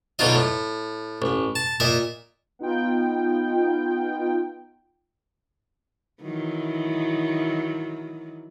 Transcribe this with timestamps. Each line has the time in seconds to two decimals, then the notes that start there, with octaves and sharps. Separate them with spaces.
0.19 B1 D3 D#4 F4 D#5
0.35 A2
1.22 A1
1.55 A5
1.80 A#2 D#5 E5
2.59 B3 D#4 F4 G5
6.23 D#3 E3 F#3